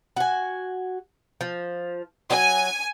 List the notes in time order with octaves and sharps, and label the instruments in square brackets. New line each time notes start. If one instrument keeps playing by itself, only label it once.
[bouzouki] F#4 G#5
F3
[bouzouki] F#3 [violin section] G#5